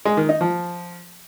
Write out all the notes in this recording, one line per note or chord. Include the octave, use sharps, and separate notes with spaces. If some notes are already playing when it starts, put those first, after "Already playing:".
G#3
D#3
D#4
F3